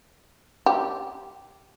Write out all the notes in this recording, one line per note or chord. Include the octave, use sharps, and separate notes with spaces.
G4